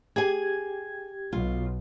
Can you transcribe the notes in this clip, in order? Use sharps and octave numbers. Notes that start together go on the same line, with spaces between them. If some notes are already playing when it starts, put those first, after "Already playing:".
G4 G#4 G#5 G#6
B1 B2 F4